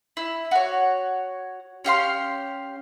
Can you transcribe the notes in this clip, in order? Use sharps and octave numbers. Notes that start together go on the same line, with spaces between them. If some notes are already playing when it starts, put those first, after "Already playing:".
E4
F#4 C#5
C#4 G4 F5 C6